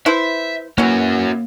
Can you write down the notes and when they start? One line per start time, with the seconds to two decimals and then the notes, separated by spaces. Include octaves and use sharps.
0.06 E4 B4 C5 E5
0.78 E3 F#3 A#3 C#4 F#4